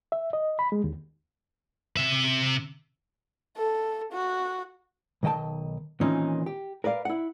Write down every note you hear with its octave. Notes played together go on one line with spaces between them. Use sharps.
E5
D#5
B5
G#3
D#2
C3 E5
A4
F#4
B1 D#3 D#5 G5 A5
A#2 D#3 E3 C4 C#4 D#4
G4
A#4 B4 D5 F5
E4 F#5